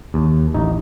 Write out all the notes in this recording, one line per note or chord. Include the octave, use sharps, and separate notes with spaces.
D#2
A1 D#4